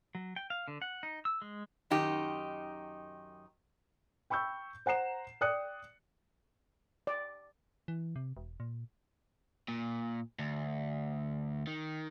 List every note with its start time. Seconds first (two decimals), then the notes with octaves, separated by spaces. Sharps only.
0.15 F#3
0.36 G5
0.50 F5
0.68 D3
0.82 F#5
1.03 D#4
1.25 E6
1.42 G#3
1.90 F#2 D#3 D#4 G4
4.30 G5 B5 C#6 E6 G6
4.86 C5 F#5 A#5 C7 E7
5.41 D5 G5 D#6 F#6 C#7
7.07 D5
7.88 E3
8.16 C3
8.37 E1
8.60 A#2
9.68 A#2
10.39 D2
11.67 D#3